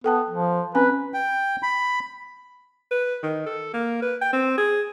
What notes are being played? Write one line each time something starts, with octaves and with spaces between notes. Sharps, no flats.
B3 A4 G5 A5
F3
C4 C#4 B4 G#5
G5
B5
B4
D#3
A4
A#3
B4
G5
C4
G#4